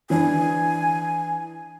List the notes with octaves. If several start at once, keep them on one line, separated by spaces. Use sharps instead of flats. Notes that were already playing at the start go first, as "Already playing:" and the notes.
E3 D4 G#5